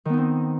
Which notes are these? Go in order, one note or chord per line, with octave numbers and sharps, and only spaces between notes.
D#3 B3 C4 D#4